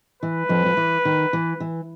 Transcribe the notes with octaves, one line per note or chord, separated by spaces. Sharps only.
E3 B4
F2 F3
F3
E3
D#3
E3
E3